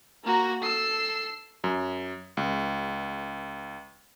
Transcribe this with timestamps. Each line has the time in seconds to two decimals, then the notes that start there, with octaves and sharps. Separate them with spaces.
0.24 A#3 F#4 A#4 A#5
0.62 A4 E6 C7
1.64 F#2
2.37 C#2